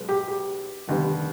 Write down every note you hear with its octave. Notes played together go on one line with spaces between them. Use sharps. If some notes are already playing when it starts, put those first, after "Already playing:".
Already playing: B1 B2 G#3 B3
G4
G4
F1 D#2 D3 G3 B3